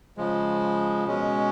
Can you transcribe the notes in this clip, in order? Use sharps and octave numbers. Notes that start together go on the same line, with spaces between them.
C#3 F3 G#3
B2 G#3 C#4